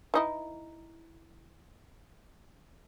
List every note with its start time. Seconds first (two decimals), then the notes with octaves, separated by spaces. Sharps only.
0.14 E3 D#4 E4